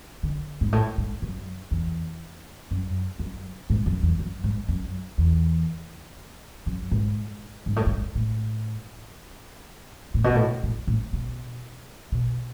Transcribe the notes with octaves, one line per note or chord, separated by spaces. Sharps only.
D3
G#2
A2
G#2
F#2
E2
F#2
F#2
G#2
F#2
E2
F#2
G#2
F#2
E2
F#2
G#2
G#2
A2
G#2
A2
A2
B2
A2
A2
A2
B2
B2